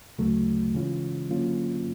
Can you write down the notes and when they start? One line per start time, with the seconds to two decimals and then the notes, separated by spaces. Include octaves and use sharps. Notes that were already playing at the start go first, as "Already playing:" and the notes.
0.18 D2 C#3 F#3 A3
0.75 C#3 E3 G#3 C#4 F4
1.30 D3 F#3 A#3 C#4 F4